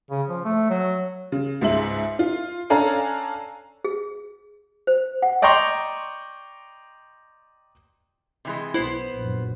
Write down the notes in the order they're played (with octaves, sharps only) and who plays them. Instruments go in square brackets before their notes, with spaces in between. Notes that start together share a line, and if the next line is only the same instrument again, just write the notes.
[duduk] C#3
F3
A3
F#3
[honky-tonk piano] C#3
C#2 G#2 E5 F#7
F4
C#4 D4 A4 F5 G#5 A#5
[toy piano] G#4
C5
F#5
[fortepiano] D5 D#5 G5 A#5 C6 C#6
[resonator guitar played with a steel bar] C3 E3 G#3
[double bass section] B1 [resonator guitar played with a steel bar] B3 C5 [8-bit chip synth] E4
[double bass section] A#1 F#2 F#3